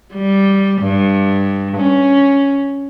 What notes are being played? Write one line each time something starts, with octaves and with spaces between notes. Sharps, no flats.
G3
G2
C#4